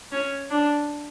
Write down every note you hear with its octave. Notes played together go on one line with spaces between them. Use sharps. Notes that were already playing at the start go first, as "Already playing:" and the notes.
C#4
D4